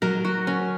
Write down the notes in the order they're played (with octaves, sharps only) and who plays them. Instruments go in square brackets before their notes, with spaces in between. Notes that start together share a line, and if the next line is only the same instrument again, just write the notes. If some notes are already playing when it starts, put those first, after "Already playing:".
[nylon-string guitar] F#3 [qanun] A#4
[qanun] F#4
C#4